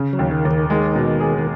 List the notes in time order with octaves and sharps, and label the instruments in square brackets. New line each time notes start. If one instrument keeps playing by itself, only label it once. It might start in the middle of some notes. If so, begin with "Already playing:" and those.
Already playing: [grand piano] C#3
[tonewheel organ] F#3
[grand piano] D#2
[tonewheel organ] D#3
[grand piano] D#2
[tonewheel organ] D#3
[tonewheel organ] D#3 [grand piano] G#3
[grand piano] B2
G#4
[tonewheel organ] D#3